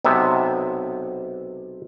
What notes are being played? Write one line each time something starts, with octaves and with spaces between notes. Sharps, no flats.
B1 C3 B3 E5